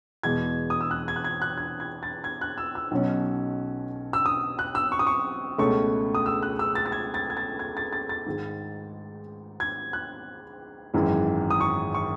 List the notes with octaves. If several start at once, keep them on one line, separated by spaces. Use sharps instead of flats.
E2 B2 G#3 G#6
D#6
E6
F#6
G#6
F#6
G#6
F#6
G#6
G#6
A6
G#6
F#6
E6
E6
B1 B2 F#3 C#4
E6
D#6
F#6
E6
C#6
D#6
C#6
C#2 B2 A3 C#4 C#6
D#6
E6
F#6
E6
A6
A6
G#6
A6
G#6
A6
G#6
A6
A6
A6
G#2 D#3 G#3
G#6
F#6
G#1 F#2 E3 G#3
D#6
C#6
C#6